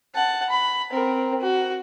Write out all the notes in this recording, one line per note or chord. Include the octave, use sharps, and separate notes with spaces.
F#5 A5
B5
C4 A#4
F#4